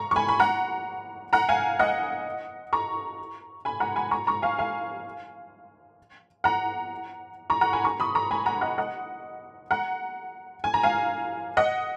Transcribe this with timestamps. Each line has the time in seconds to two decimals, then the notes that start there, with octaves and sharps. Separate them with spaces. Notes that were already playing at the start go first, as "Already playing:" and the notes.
Already playing: A#5 C#6
0.11 C#6
0.16 G#5 B5
0.28 B5
0.39 F#5 A#5
1.33 F#5 A#5
1.49 F5 G#5
1.79 D#5 F#5
2.73 A#5 C#6
3.65 G#5 B5
3.80 F#5 A#5
3.96 G#5 B5
4.11 A#5 C#6
4.27 A#5 C#6
4.42 F5 G#5
4.59 F5 G#5
6.44 F#5 A#5
7.50 A#5 C#6
7.61 F#5 A#5
7.73 G#5 B5
7.84 A#5 C#6
8.00 B5 D#6
8.15 A#5 C#6
8.31 G#5 B5
8.46 F#5 A#5
8.61 D#5 F#5
8.78 D#5 F#5
9.71 F#5 A#5
10.64 G#5
10.74 A#5
10.83 F5 G#5
11.57 D#5 F#5